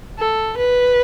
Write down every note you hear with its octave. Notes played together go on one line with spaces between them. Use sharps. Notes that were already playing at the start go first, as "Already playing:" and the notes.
A4
B4